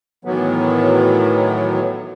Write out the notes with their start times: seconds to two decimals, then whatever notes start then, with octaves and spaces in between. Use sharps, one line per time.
0.25 A2 D#3 E3 F#3 B3